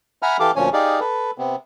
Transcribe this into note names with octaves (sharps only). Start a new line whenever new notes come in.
E5 F#5 G#5 A#5 B5 F6
E3 G4 A4 F5 D6
D2 A#2 F3 C#4 C#5 G#5
D#4 G4 G#4 D5 F5
A4 B4
C3 B3 C4